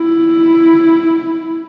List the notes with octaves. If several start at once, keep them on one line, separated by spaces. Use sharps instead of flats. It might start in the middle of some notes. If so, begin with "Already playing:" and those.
Already playing: E4